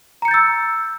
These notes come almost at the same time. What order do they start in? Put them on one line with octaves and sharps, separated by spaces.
A#5 C#7 G6 A6 E6